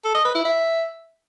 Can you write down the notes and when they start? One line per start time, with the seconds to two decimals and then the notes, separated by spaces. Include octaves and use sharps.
0.04 A4
0.14 D#5
0.25 B4
0.35 E4
0.45 E5